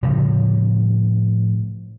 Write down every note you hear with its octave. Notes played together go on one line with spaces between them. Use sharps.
A2 C#3 F3 G3